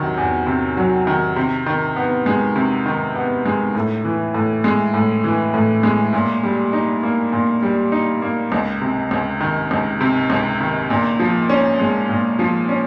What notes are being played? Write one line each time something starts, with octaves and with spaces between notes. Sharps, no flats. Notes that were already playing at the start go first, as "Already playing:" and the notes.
Already playing: E2 C3 D#3 F#3
E2
C3
F#3
D#3
C3
D#3
B3
G#3
C3
D#3
B3
G#3
A2
E3
A2
G#3
A2
E3
A2
G#3
A#2
G3
D#4
A#3
A#2
G3
D#4
A#3
C#2
C3
C#2
D#3
C#2
C3
C#2
D#3
A#2
F3
C#4
G#3
A#2
F3
C#4